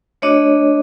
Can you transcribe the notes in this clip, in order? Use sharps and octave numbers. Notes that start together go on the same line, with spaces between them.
A3 D4 F#4 C#5 D#5